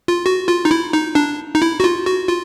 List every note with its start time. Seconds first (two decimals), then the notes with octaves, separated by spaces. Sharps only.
0.08 F4
0.26 F#4
0.48 F4
0.65 D#4
0.71 E4
0.93 D#4
1.15 D4
1.55 D#4
1.62 E4
1.80 F#4
1.84 F4
2.06 F#4
2.28 F4